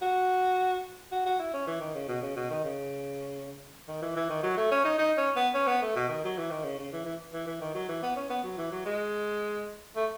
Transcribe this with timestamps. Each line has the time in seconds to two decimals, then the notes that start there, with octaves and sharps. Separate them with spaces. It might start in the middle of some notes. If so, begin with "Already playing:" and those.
0.02 F#4
1.12 F#4
1.26 F#4
1.40 E4
1.53 C#4
1.67 E3
1.81 D#3
1.95 C#3
2.08 B2
2.22 C#3
2.36 B2
2.50 D#3
2.64 C#3
3.88 D#3
4.02 E3
4.16 E3
4.30 D#3
4.43 F#3
4.57 A3
4.71 C#4
4.85 D#4
4.99 D#4
5.17 C#4
5.36 B3
5.54 C#4
5.67 B3
5.82 A3
5.96 B2
6.09 D#3
6.24 F#3
6.38 E3
6.51 D#3
6.64 C#3
6.78 C#3
6.92 E3
7.06 E3
7.33 E3
7.47 E3
7.61 D#3
7.75 F#3
7.89 E3
8.03 B3
8.16 C#4
8.30 B3
8.44 F#3
8.58 E3
8.72 F#3
8.86 G#3
9.96 A3